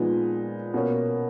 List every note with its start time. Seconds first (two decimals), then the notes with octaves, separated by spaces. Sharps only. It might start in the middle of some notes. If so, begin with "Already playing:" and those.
Already playing: A#2 F3 G#3 B3 D#4
0.74 B2 A#3 C#4